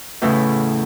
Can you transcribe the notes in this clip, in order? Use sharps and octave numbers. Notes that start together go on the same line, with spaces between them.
E2 A2 C#3 E3